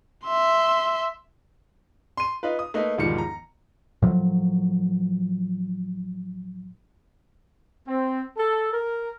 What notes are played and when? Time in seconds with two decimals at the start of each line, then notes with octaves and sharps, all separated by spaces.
0.25 E5 C6
2.17 C6 D#7
2.43 D#4 F4 B4
2.59 D#6
2.74 A3 A#3 D#4 B4
2.98 E1 G#2 D#3 F3 G3 C#7
3.18 A#5
4.02 A2 F3 F#3
7.87 C4
8.37 A4
8.73 A#4